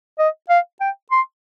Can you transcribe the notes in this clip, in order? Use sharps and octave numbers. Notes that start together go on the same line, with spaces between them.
D#5
F5
G5
C6